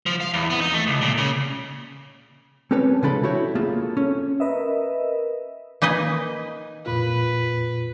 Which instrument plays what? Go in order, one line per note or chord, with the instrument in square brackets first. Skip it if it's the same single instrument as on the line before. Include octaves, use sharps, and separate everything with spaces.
[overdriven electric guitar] F3
F5
E2
B3
D#4
A3
C#2
A#2
C#3
[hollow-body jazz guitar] C4 C#4 G4 A4 B4 C#5
C#3 F3 G#3 D4 A4 B5
E4 F#4 G4 C#5
A#3 F4 G#4 A4
C#4
[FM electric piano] A#4 B4 D#5 E5
[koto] A#3 D#4 B4 D#5 G#5
[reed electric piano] F2 A#2 F4 [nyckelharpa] B4